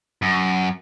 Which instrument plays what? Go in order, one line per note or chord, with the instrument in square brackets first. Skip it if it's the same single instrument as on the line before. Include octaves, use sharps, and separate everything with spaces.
[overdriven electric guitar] F#2